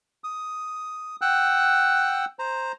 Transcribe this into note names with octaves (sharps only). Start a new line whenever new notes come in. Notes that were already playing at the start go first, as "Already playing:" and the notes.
D#6
F#5 G5 E6 F#6
C5 A#5